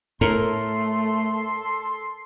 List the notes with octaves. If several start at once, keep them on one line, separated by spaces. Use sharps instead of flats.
A2 A3 A4 A#4 C6